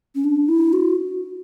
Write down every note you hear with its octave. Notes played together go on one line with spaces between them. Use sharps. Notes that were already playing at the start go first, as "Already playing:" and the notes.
C#4
D4
E4
F#4